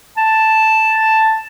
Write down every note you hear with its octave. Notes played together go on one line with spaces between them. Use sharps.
A5